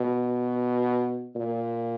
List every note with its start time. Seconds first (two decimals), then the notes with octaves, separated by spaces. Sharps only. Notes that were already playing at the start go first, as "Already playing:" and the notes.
Already playing: B2
1.36 A#2